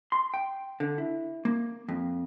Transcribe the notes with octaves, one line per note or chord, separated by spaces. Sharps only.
C6
G5
D3
E4
A#3
F2